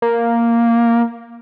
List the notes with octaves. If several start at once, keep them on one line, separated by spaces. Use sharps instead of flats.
A#3